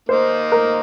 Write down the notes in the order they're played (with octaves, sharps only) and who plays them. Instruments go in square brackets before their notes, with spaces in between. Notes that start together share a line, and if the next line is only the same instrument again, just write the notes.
[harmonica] A#3 D#4 [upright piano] C5
[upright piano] A#4